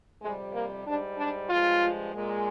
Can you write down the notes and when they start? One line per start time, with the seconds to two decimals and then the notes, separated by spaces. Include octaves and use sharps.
0.22 F2 C3 G3 G#3
0.54 A#3
0.85 G#2 G3 D4
1.18 D4
1.50 G2 F3 G#3 F4
2.13 A#2 G#3